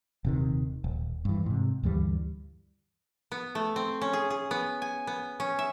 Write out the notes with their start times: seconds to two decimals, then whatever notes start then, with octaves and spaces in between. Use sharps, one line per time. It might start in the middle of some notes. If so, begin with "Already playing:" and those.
0.25 D#1 C3 D#3
0.84 D#1
1.25 G2 E3
1.46 G#2 C3
1.83 D2 G2 E3 G3
3.32 B3
3.55 A3
3.76 C4
4.01 C#4
4.13 G#4
4.30 G#4
4.51 B3
4.82 G#5
5.07 B3
5.40 C#4
5.59 E5